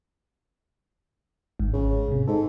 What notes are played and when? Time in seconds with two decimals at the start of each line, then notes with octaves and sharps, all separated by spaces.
1.60 G#1 G#2
1.73 C#3
2.08 G#2 C3
2.28 G#2 A4